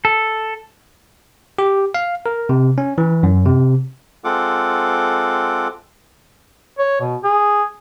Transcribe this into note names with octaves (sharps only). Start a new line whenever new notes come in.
A4
G4
F5
A#4
C3
C#4
E3
F#2
C3
G#3 C4 F4 A4 F#5 D6
C#5
B2
G#4